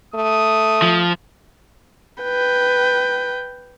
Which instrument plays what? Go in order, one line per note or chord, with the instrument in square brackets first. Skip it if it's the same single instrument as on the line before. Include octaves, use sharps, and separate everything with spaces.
[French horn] A3 [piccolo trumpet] D#6
[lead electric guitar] F3
[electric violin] B4 G5